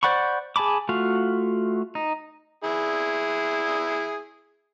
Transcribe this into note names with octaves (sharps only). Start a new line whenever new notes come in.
C5 D5 F#5 B5 C#6
G#4 G#5 A5 B5 D6
A3 F4 F#4 F5
D#4
E4 G#4